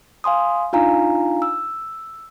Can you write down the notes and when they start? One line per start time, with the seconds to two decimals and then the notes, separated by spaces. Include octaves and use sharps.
0.24 F5 G#5 C6 D#6
0.73 D4 D#4 F4 F5 G#5 A#5
1.42 E6